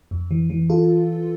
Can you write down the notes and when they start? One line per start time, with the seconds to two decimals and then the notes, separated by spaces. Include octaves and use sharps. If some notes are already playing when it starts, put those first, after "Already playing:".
0.11 F2
0.31 E3
0.50 E3
0.70 F4 A4